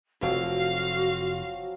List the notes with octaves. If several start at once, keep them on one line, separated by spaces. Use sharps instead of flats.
F1 F3 F#3 C4 F#4 F5